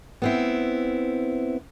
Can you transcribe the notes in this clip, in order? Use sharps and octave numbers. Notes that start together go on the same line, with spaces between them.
B3 C4 E4